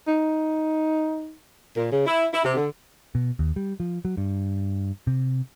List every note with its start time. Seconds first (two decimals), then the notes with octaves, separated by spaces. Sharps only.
0.07 D#4
1.75 A#2
1.90 C#3
2.05 E4
2.31 E4
2.43 C3
2.56 D3
3.15 B2
3.39 D#2
3.56 G3
3.80 F3
4.05 F#3
4.17 G2
5.07 C3